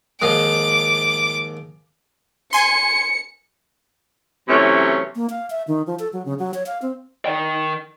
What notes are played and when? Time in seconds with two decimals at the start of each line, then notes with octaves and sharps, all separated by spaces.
0.22 D#2 G#2 F3 D6
2.53 G#5 C6 C#7
4.48 C3 E3 F#3 A3 C#4
5.15 A#3
5.30 F5
5.50 E5
5.68 D#3
5.87 F3
5.99 A4
6.13 F#3
6.25 C#3
6.39 F#3
6.54 C#5
6.66 F5
6.82 C4
7.25 D#3 G5